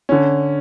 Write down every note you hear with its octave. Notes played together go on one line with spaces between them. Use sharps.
D3 C#4